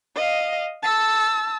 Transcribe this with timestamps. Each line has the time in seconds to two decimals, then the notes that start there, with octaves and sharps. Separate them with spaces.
0.16 D#5 F5
0.83 A5 E6